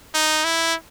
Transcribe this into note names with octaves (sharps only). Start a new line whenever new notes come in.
D#4
E4